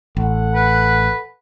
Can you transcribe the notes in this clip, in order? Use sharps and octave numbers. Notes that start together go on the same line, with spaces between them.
A1 A4 F#5
B4